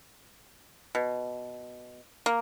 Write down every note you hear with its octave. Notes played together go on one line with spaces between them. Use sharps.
B2
A#3